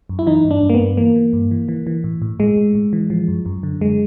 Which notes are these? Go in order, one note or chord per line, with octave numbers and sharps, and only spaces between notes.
F#2
E4
E3 D#4
G2
D4
G2
A#3
B3
G2
E3 A#3
E3
G2
E3
E3
E3
A2
A2
A2 G#3
A2
A2
E3
F3
F#2
F#2
D3
F#2 G#3